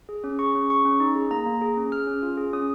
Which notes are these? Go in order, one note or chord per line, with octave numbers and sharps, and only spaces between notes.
G#4
C#4
G#4 C#6
C#4
G#4 C#6
C#4
D#4
G#4
A#3 A#5
A#3
G#4
C#4
G#4 F6
C#4
F4
G#4
C#4 D#6